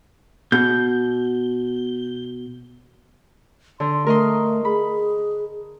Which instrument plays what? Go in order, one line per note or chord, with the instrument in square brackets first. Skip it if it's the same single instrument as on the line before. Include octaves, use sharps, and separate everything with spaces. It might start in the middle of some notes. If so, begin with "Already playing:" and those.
[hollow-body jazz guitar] B2 [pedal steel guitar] G6
[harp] D3 [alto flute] C6
[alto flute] A3 [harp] A#4 D#5 C6
[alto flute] G#4 [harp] B5